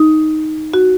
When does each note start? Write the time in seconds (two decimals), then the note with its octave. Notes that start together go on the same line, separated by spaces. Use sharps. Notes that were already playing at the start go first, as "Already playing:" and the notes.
Already playing: D#4
0.74 F#4